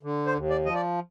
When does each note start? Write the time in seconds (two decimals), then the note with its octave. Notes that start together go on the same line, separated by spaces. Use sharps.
0.03 D3
0.26 C5
0.34 D#2
0.50 D5
0.65 F3 D#5
0.74 D5